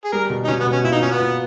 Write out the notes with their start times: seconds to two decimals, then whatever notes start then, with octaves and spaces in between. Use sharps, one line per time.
0.04 G#4
0.12 G3 A#4
0.30 B2
0.44 D#4
0.48 B2 C#4
0.61 B3
0.66 B2
0.73 C#4
0.84 A#2 E4
0.93 D#4
1.02 A#2 C#4
1.11 B3
1.20 A#2